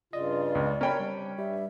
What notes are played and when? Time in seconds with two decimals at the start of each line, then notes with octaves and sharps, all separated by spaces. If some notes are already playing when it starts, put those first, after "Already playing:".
0.13 G2 C#3 F4 D5 D#5
0.55 C#2
0.81 C3 C#4 D4 A#4 C#5 G5 B5
1.00 G3
1.38 G2 G3 E5